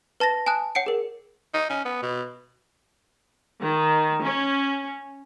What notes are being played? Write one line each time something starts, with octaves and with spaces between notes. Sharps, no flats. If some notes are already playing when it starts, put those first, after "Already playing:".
B4 A5 A6 A#6
G#5 A5 D#6 F#6
C#5 F#5 G5 C#7 D7
G#4 A#4
D#4
C#4
B3
B2
D#3
C#4